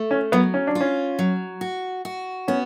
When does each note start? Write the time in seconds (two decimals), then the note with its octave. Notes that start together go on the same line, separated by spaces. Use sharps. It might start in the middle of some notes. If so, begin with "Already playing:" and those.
Already playing: A3
0.11 C#4
0.32 F#3 B3
0.54 C#4
0.67 D4
0.75 F4
0.81 C#4
1.19 F#3
1.61 F#4
2.05 F#4
2.48 B3 C#4